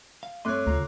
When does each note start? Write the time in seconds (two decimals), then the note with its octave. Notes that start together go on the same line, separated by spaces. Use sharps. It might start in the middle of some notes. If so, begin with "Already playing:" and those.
0.23 F5
0.45 G2 A3 C4 C#5 D#5 C6 D6 F#6
0.67 D2 C#3 F4 A#5